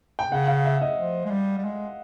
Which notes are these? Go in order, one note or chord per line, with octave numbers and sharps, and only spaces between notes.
G5
C#3 F#5
F5
E5
D#5
F3
G#3
G3
G3
G#3